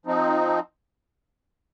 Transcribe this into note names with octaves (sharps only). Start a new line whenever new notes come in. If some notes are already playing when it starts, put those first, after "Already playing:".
F3 C4 D#4